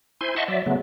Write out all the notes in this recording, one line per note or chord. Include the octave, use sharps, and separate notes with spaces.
E4 C5 G#5 C6
D#5 E5 F#5 A5 C6 C#6
F#3 D5 E5
C#3 F#3 A3 B3